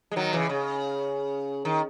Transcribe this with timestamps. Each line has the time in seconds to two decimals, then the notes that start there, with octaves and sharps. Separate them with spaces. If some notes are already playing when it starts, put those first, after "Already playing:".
0.11 G#3
0.16 D#3 F#3
0.33 C#3 E3
0.49 C#3
1.65 D#3